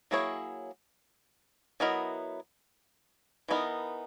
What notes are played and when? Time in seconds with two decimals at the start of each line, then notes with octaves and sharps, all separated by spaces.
0.11 F#3 A#3 E4 G#4 C#5
1.80 F#3 B3 E4 A#4 D#5
3.48 E3 B3 D#4 A#4